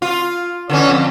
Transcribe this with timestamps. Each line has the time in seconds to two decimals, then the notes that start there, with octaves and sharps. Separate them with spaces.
0.02 F4
0.70 D3 E3 C#4
0.89 F2